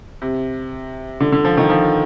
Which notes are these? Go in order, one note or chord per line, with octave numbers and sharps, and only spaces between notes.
C3
D3
D3
F3
D#3
F3